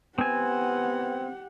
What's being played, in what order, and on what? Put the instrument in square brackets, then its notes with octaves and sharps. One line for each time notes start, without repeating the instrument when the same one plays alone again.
[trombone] B3 [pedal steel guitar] C4 G#5 [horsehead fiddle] G4 F#5